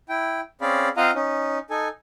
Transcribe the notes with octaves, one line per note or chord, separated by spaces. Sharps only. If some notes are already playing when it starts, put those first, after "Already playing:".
E4 G5
C4 C#4 G#4 D5 F5 B5
C4 F4 D#5 F5 F#5 A#5
C#4 D#4
D#4 A4 G#5